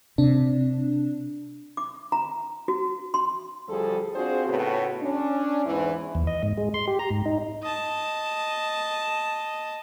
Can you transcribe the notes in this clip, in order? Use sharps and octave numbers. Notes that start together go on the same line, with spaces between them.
C3 D4
D6
A#5
F#4
C6
D2 F3 G3 G#4 A4
C4 D4 F4 F#4 G#4 C5
A2 C#3 B3 F#4
C#4 D4
E2 G#2 E3
E2
D#5
G#2
G#3
C6
G4
A#5
G#2
D#4
D#5 A5